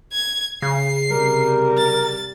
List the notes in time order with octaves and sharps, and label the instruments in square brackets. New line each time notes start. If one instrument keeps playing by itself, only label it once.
[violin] G#6
[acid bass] C#3 [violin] C7
[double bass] C3 G3 [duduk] A#4
[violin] A6